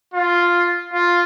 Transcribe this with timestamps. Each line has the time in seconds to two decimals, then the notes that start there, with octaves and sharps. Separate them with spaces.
0.14 F4
0.93 F4